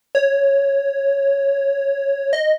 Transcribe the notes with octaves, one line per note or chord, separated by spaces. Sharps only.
C#5
D#5